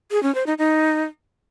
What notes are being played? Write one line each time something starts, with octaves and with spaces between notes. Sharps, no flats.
G#4
C#4
C5
D#4
D#4